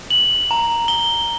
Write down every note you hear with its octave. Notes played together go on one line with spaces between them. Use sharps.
F#7
A#5
G7